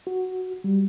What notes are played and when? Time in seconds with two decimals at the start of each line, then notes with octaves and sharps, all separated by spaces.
0.07 F#4
0.64 G3